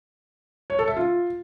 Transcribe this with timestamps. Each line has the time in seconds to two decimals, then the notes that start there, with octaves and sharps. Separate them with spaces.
0.70 C#5
0.79 A4
0.88 E5
0.97 F4